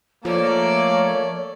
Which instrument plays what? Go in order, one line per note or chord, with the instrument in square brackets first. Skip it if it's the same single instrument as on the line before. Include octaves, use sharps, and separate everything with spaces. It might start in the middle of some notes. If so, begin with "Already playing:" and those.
[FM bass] F3 [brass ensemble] A3 A#3 [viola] A4 D5 [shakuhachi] C#5